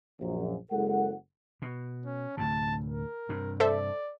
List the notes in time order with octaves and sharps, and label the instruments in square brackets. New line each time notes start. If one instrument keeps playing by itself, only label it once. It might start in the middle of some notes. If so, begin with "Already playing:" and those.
[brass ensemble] A#1 F#2
F#1 G#3 E4 A4 A#4 F#5
[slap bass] B2
[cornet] C#4
[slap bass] D2 A2 C3 [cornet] A5
[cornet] A#4
[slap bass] G2 C3
[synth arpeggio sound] A4 C5 E5 [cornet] D5